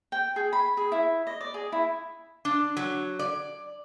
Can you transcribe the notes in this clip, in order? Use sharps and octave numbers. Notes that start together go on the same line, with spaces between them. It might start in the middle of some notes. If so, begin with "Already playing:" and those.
G5
G#4
B5
G#4
E4
D#5
D5
G#4
E4
D4
F#3
D5